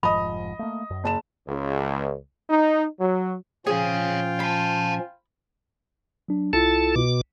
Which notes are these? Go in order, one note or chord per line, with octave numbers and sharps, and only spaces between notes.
F1 G#2 F3 D#5 B5 D#6
A3 A#3
F#2
F#1 A5 E7
C#2
D#4
F#3
A#2 F3 C#4 F4 G#4 C#5 F5 G5
F5 A5 B5
F#3 D4
C2 E4 F4 A4 A5
B2 D6